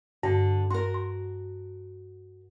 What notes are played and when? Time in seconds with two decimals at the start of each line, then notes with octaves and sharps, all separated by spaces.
0.23 G2 D3
0.71 F#4 A#4 C6
0.94 C6